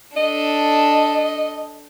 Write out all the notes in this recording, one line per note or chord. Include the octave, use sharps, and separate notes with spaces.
D4 A4 D#5